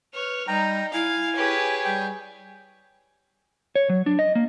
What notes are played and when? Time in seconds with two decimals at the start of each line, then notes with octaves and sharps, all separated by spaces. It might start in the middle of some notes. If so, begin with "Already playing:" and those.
0.14 B4 C#5 F6
0.48 G3 D#4 G5 A#5
0.93 E4 F5 G#5
1.36 G4 G#4 B4 C#5
1.85 G3 G5
3.75 C#5
3.89 F#3
4.06 D4
4.19 D#5
4.35 A#3